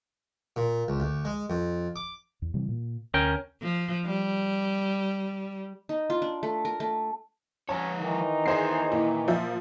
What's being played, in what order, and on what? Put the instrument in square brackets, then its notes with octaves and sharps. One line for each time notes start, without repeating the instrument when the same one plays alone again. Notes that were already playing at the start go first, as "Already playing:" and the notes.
[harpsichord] A#2
C#2
D2
G#3
F2
D6
[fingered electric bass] E2
C3 E3 G3
A#2
[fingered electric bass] D2 [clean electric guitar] C#4 A#4 G5
[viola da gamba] F3
G3
[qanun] D#4
F4
D4
A3
A#4
A3
[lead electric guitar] F3 C#5 [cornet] C#4 [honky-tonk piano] A5
[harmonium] D#3 E3 [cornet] D#4
[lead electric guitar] E2 E5 [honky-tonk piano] G#4 C5 C7
[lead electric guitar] A#2 [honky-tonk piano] E4
[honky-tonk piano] F3 E5